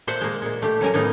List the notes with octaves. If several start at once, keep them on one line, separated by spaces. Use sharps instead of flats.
A#2 C5 E5 F#5 A5
G#3 A#3
A#2 G#3
A3 G4
F#3 C#4 A#4 G#5
A2 A#3 B3 D#4